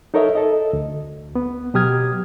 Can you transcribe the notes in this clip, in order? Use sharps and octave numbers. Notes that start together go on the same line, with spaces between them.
D#4 A4 A#4 C#5 D#5 E5
A4 D#5
D2
B3
B2 F#3 G4 D#6 F6 G#6